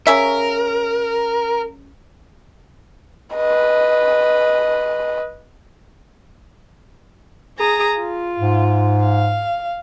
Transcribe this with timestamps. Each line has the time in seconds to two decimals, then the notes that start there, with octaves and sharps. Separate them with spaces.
0.07 C#3 C#4 A#4 E5
3.34 B4 D#5
7.57 G#4 A#5 D#6
7.99 F4
8.39 G#2
9.03 F5